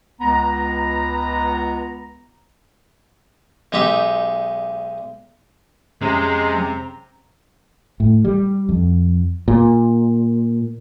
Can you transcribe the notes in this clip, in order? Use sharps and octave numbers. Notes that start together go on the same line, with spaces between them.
C#2 B3 A#5
B1 G#3 D#4 G4 E5
F2 C3 G#3 C#4 G#4 A#5
A2
G3
F2
A#2